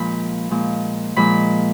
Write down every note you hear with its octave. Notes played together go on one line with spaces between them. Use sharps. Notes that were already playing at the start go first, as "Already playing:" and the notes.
Already playing: A#2 F3 G#3 B5
A#2 F3 G#3
A#2 F3 G#3 B5